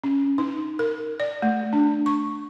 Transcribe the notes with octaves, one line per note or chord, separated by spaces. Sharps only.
C#4
D#4
A#4
D5
A3
D4
C#6